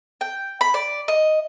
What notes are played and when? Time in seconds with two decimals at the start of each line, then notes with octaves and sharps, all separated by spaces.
0.21 G5
0.61 B5
0.74 D5
1.08 D#5